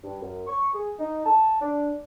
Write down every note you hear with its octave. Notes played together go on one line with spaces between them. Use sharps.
G2
F#2
C#6
G#4
D#4
A5
D4